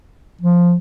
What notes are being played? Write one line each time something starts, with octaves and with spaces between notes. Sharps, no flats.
F3